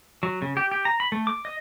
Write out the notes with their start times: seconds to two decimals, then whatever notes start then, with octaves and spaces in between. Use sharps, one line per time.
0.23 F#3
0.42 C#3
0.57 G4
0.71 G4
0.85 A#5
1.00 B5
1.12 A3
1.27 D6
1.45 D#5